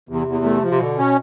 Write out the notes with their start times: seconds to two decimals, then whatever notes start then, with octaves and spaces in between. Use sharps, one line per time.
0.09 E2 C3
0.27 E2
0.44 A3
0.62 F3
0.71 C3
0.80 B2 D3
0.98 B2 C#4